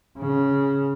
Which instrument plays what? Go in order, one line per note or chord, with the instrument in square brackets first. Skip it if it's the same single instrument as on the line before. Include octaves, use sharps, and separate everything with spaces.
[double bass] C#3